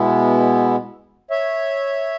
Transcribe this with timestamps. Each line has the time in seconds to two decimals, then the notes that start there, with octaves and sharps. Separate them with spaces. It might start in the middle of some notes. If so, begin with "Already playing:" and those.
Already playing: B2 G#3 B3 E4
1.30 C#5 E5